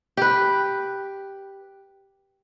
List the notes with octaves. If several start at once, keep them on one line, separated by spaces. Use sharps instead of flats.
G4 B4